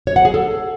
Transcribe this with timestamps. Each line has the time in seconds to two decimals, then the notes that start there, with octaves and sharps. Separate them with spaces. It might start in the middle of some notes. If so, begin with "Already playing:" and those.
0.07 C#5
0.16 F#5
0.25 G#4
0.34 A4